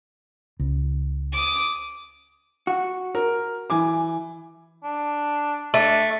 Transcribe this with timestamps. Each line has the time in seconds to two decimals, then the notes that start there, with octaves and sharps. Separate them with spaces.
0.59 C#2
1.33 D6 D#6
2.67 F#4
3.15 A#4
3.70 E3 G#5 D6
4.84 D4
5.74 A3 D4